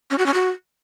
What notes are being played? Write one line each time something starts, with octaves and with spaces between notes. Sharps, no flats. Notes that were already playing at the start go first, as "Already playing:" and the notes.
C#4
F#4
C#4
F#4